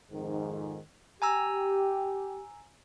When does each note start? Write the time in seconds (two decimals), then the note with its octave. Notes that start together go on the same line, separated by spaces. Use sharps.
0.11 F2 G#2 D#3
1.22 G4 G#5 A#5 E6